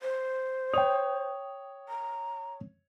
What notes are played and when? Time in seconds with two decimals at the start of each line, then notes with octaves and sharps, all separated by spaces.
0.01 C5
0.73 C#5 G5 D#6 F7
1.89 A#5